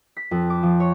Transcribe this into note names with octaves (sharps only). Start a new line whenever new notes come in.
B6
F2
D6
F3
C#5